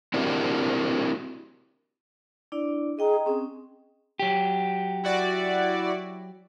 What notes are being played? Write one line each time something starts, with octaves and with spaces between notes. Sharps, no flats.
C4 D4 E4 F#4 G4 A#4
D4 E4 D5
G#4 D#5 G5 A#5
C4 C#4 G#4
F#3 G4
E4 F#4 D5